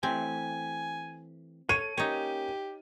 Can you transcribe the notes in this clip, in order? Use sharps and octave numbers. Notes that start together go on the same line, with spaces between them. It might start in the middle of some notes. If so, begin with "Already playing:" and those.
E3 A3 C4 G4 G#5
A4 C#5 D#7
A#3 C#4 D#4 G4 C#5